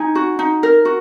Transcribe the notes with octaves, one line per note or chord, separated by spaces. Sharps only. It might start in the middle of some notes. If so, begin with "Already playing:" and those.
Already playing: D#4 G#5
F#4
D#4
A#4
F#4